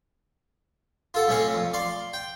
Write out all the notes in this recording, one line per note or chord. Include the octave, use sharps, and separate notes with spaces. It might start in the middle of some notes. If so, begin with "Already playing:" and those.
F4 A4 F#5
B1 A3 C4 C#4 F5 F#5
F2
D5 F5 C6
G5